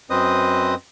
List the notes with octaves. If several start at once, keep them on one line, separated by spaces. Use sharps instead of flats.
F#2 C4 B4 C5 D#5 D#6